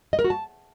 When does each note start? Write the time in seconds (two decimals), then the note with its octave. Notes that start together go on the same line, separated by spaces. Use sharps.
0.13 D#5
0.19 A#4
0.24 F#4
0.30 A5